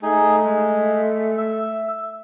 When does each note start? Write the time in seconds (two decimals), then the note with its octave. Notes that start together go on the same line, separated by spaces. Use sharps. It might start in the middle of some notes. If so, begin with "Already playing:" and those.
0.03 A3 D#4 G#4
0.44 G#3
1.38 E5